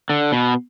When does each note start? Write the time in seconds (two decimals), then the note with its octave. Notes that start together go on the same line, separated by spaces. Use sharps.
0.10 D3
0.32 B2